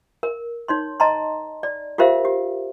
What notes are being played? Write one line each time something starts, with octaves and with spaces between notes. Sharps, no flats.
A#4
D#4 C#5 C6
D#5 A5 A#5 C6
D5
F4 G4 A#4 C5 E5 F5
G4